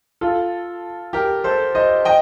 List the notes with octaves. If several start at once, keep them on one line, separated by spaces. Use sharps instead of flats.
F4 A4
G4 A#4
A4 C5
C5 D#5
D#5 G5